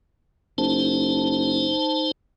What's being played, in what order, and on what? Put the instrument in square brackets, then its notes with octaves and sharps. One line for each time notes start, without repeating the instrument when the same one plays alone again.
[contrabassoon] F#1 [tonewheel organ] D#4 C5 A5